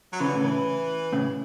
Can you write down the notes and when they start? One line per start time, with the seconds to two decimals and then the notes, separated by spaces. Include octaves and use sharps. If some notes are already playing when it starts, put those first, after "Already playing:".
0.13 F#3
0.20 C#3 E3
0.28 D3
0.35 A2 C#3
0.44 E3
1.12 A2 C#3